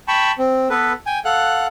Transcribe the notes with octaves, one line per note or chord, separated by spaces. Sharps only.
G5 A5 B5 C#6
C4
B3 A4 B4
G5 G#5
A4 F5 F#5 F#6